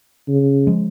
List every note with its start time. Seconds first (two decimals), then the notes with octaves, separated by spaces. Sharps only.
0.28 C#3
0.67 F3 G#3